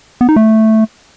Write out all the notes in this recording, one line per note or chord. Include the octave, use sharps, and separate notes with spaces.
B3
D#4
A3